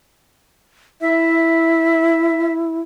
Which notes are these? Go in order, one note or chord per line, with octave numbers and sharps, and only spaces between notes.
E4 E5